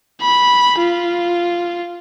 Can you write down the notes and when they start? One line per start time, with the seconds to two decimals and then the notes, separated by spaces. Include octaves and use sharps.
0.22 B5
0.79 F4